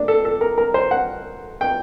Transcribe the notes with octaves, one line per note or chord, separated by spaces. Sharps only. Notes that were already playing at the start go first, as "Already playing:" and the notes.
Already playing: A2 A#3 D4
A4
A4
A#4
A#4
C5
F#5
G5